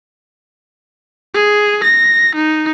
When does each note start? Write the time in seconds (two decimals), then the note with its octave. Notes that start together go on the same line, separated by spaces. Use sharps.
1.34 G#4
1.84 A#6
2.35 D#4